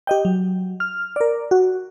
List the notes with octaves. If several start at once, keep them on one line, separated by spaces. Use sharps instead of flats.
G4 D#5 G5
F#3
F6
A#4 D5
F#4